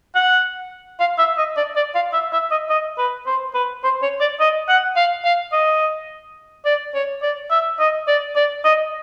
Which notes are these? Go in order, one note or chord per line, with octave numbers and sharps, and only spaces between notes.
F#5
F5
E5
D#5
D5
D5
F5
E5
E5
D#5
D#5
B4
C5
B4
C5
C#5
D5
D#5
F#5
F5
F5
D#5
D5
C#5
D5
E5
D#5
D5
D5
D#5